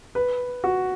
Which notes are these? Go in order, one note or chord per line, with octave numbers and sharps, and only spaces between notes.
B4
F#4